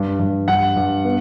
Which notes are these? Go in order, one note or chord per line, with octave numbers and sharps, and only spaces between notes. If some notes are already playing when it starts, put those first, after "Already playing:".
Already playing: G2
G2
G2 F#5
G2
B3